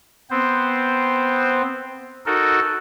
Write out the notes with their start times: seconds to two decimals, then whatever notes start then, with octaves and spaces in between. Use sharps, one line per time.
0.30 B3 C4 C5
2.26 D#4 F#4 A4 A#4